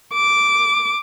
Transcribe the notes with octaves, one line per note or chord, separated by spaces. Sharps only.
D6